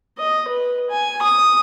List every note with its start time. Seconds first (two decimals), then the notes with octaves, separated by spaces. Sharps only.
0.18 D#5
0.48 B4
0.90 G#5
1.22 D#6